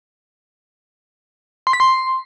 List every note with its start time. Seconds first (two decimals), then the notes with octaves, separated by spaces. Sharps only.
1.67 C6
1.73 B6
1.80 C6